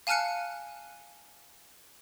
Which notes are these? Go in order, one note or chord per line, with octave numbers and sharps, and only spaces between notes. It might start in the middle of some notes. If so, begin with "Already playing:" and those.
F5 G#5 A5 F6 F#6 C#7